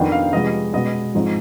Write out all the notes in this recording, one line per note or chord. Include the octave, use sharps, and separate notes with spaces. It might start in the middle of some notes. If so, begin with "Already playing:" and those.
Already playing: F2 D#3 B3 D4 G5
F5
C3 F3 G#3 B3 D#5
B2 G#3 B3 D#5
G#2 F3 C4 D#4